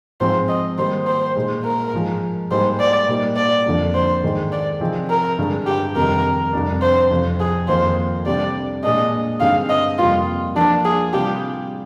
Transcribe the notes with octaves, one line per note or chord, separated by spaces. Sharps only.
G#2 F3 G#3 C4 C5
D#5
D#3 G3 A#3 C5
C5
A#2 G#3 D#4 G#4
A#4
G#2 F3 G#3
G#2 G3 A#3 D#4 G#4 C5
D5
A#2 G3 A#3 D#4
D5
F2 D3 F3 A#3 D4
C5
G#2 D#3 G#3
D5
C3 F3 C4 D#4 G#4
A#4
G2 D3 G#3 D4
G4
F2 C3 D#3 G3 A#4
F2 C3 G3 D4
C5
F2 C3 F3
G#4
F2 D#3 A#3 F4 C5
C3 G3 D4 G4 D5
A#2 G#3 D4 G#4 D#5
G2 D3 G#3 C4 D#4 F5
D#5
F2 C3 G3 A#3 F4
F3 A#3 D4 F4
G#4
C3 G3 D4 F4 G4 G#4